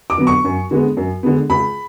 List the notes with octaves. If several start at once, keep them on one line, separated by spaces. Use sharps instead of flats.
D6
D3 F#3 B3
C#6
F#2
D3 G#3 B3
F#2
D3 G#3 B3
C#2 B5